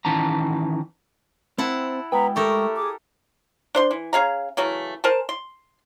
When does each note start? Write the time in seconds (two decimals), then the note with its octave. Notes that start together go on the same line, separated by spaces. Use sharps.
0.05 D#3 E3 C#4 A5 A#5
1.58 C4 E4 C5 F#5 A5
2.12 G#3 B3 G5 A#5 B5
2.36 A3 G4 A4 A#4 C#6 D#6
2.76 G#4 D6 D#6
3.75 D4 C5 C6
3.91 E3
4.13 C#4 G#4 F5 A#5
4.57 C#3 E3 F#3 A3
5.04 A#4 C5 G#5 A5
5.29 C6